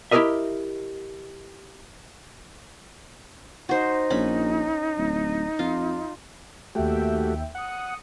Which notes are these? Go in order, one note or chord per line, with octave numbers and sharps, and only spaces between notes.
E4 G4 G#4 A#4 D#5 E5
D#4 F#4 C5
A#1 C#4 B5
D1
F2 F4
D#2 A3 F#4 G4 E5 G5
F#5 D#6 C#7